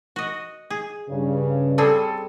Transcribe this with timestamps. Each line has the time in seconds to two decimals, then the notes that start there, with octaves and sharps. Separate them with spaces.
0.16 F#4 D#5
0.70 G#4
1.10 G2 C#3
1.78 G3 C4 G#4 A4